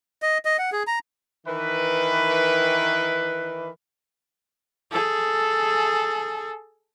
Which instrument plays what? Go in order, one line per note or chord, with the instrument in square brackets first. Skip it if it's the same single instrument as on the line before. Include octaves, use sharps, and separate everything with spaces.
[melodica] D#5
D#5
F#5
G#4
A#5
[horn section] D#3 E3 B4
[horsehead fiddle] G#4 A4